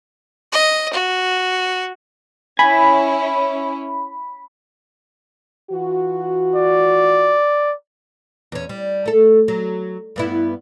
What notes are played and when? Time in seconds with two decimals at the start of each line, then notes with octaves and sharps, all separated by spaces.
0.52 D#5
0.93 F#4
2.59 C#4 E4 G#5 B5
5.71 E3 F4 F#4
6.56 D5
8.52 E2 C#4
8.69 G3
9.06 A3 A4
9.48 F#3
10.16 G2 B3 E4